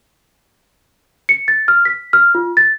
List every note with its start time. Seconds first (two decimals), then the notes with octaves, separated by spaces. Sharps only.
1.29 C#7
1.48 A6
1.68 F6
1.85 B6
2.13 F6
2.35 F4
2.57 A6